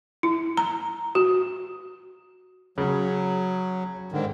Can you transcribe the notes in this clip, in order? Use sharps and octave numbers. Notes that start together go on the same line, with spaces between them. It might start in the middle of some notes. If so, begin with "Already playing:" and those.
E4
A#5
F#4
C#3 F#3
G#2 D3 D#3